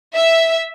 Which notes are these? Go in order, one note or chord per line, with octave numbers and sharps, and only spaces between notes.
E5